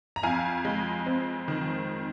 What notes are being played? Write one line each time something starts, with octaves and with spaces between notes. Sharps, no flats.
A#5
F2 F5 G#5
G#3
C4
D#3